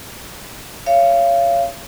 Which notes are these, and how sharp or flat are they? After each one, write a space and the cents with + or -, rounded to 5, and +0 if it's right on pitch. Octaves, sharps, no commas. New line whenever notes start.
C#5 +5 F5 -30